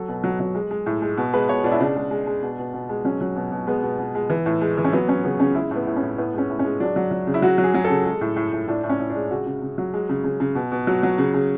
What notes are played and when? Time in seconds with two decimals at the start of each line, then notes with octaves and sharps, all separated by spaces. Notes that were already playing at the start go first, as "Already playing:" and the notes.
Already playing: F#3 A4
0.09 B2
0.24 F#3
0.40 F#3
0.55 G#3
0.71 G#3
0.86 A2
1.02 G#3
1.17 B2
1.33 G#3 B4
1.49 B2 C#5
1.64 B2 D4
1.72 E4
1.80 C#3 D4
1.96 G#3
2.11 G#3
2.27 G#3
2.43 B2
2.59 B2
2.74 B2
2.89 G#3
3.05 F#3 C#4
3.21 F#3
3.36 B2
3.52 B2
3.67 G#3 B3
3.83 B2
3.99 B2
4.15 G#3
4.30 E3
4.46 A2
4.62 G#3
4.77 E3
4.85 C#4
4.93 F#3 B3
5.09 F#3 C#4
5.24 C#3 B3
5.40 C#3 C#4
5.55 G#3 E4
5.71 A2 B3
5.87 A2
5.96 C#4
6.03 A2
6.18 A2 B3
6.34 G#3 C#4
6.50 A2
6.59 G#3 C#4
6.80 F#3 D4
6.96 F#3
7.11 F#3
7.27 C#3
7.34 E4
7.42 F#3 F#4
7.58 F#3
7.64 G#4
7.74 F#3
7.84 A4
7.90 C#3
8.05 G#3
8.21 A2
8.36 A2
8.53 A2
8.68 A2 D4
8.84 A2
8.90 C#4
8.99 A2
9.10 D4
9.15 G#3
9.31 C#3 F#4
9.47 C#3
9.62 C#3
9.78 F#3
9.94 G#3
10.09 C#3
10.24 C#3
10.40 C#3
10.55 B2
10.72 B2
10.87 F#3
11.03 F#3
11.18 C#3
11.34 C#3